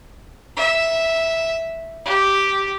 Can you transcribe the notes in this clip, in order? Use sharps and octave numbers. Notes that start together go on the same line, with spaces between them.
E5
G4